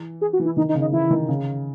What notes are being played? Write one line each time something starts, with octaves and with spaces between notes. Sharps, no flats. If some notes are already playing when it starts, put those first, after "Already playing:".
Already playing: E3
G#4
F#4
E3
E4
D#3 D#4
D#4
C#3
D#4
E3 E4
D#3
C#3